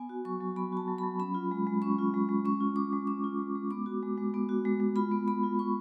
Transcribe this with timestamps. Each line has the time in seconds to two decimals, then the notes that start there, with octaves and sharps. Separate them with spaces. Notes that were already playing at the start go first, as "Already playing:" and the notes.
Already playing: B3 G#5
0.09 F#4
0.25 F#3 C#6
0.41 F#3
0.56 B3 B5
0.73 F#4 A5
0.88 F#3
0.98 F#3 B5
1.19 C#4 B5
1.35 F4
1.51 G#3
1.67 G#3
1.82 C#4 C#6
1.99 F4
2.14 G#3
2.29 G#3
2.45 C#4 C#6
2.60 F4
2.76 G#3 D6
2.93 G#3
3.07 C#4 D6
3.24 F4
3.39 G#3
3.55 G#3
3.71 B3 D6
3.86 F#4
4.03 G#3
4.18 G#3
4.34 B3
4.49 F#4
4.65 G#3
4.80 G#3
4.96 F4 B5
5.11 B3
5.28 B3 B5
5.43 F4
5.59 F4 C#6